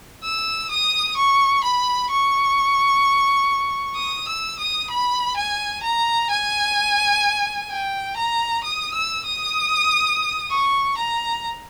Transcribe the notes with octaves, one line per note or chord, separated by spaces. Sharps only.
E6
D#6
C#6
B5
C#6
D#6
E6
D#6
B5
G#5
A#5
G#5
G5
A#5
D#6
E6
D#6
C#6
A#5